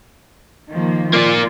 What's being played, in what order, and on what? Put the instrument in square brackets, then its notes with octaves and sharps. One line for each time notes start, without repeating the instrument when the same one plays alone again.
[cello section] D#3 F3 A#3
[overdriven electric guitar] A#3 D5 [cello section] F4